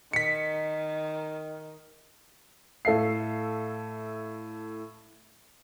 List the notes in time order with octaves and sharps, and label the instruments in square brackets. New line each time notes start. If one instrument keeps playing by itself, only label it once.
[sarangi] D#3 [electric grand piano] B6 C#7
[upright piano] A2 A4 E5 F5 C7